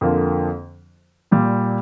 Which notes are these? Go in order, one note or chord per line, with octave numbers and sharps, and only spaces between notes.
F2 D3 A#3 F4
A#2 G3